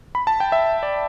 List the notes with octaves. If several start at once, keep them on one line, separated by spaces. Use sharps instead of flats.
B5
A5
G5
E5
D5